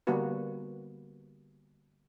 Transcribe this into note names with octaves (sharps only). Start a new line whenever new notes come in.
D3 G3 A#3 B3 F#4 B4